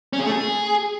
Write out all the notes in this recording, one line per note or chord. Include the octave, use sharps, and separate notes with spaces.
C#4
G#4
A3
G#4